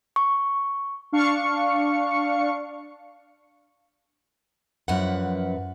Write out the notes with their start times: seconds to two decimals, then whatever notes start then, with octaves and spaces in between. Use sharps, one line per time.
0.16 C#6
1.12 D4 F5 C#6 C#7
4.88 F#2 F3 B4 F#5